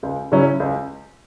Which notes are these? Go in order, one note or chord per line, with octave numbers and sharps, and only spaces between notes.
C#2
C#3 F#3 C#4 E4
C#2